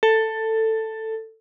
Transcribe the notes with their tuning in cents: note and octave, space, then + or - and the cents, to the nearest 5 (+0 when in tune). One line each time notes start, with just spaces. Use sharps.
A4 +10